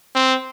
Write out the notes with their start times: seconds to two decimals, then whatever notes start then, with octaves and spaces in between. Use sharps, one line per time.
0.15 C4